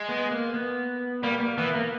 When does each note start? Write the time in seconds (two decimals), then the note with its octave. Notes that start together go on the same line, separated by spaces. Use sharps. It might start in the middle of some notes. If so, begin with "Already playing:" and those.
Already playing: G#3
0.09 B3
0.31 A#3
0.54 B3
1.23 G3 A#3
1.40 A#3
1.58 E3 B3
1.75 A#3